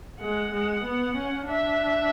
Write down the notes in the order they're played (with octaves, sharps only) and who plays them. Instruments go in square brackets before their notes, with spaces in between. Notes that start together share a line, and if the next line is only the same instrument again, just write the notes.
[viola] G#3 [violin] F#5
[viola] G#3
B3
C#4
[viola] D4 [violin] E5